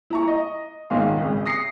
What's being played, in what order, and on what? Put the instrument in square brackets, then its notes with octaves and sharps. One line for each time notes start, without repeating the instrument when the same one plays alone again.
[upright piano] E4 A#5 C#6
D#5
B1 G#2 D#3 F4 F5 C6
G#1 C#2
D#6 A#6 C7 C#7